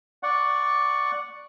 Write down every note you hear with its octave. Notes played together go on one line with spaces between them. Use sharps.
D5 F#5 C#6